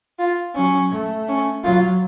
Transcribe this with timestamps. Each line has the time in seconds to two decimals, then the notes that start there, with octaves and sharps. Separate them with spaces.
0.19 F4
0.55 F#3 C#4
0.92 A3
1.28 C#4
1.64 F#3 F4